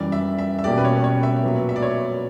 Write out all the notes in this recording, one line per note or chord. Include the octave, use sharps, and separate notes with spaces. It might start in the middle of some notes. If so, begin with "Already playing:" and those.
Already playing: F#2 E3 G3 D5
E5
E5
E5
B2 A#3 C#4 G4 D5
B4
C#5
C#5
E5
A#2 F#3 B3
E5
D5
C#5